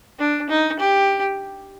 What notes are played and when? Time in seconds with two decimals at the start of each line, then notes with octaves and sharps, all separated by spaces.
0.19 D4
0.49 D#4
0.79 G4